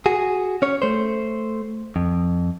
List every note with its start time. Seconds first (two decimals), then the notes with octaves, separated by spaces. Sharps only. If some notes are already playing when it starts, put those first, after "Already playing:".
0.06 F#4 G#4
0.62 C#4 C#5
0.82 A3 C5
1.96 F2